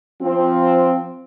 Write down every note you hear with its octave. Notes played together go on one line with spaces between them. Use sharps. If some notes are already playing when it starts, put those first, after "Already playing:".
F3 C4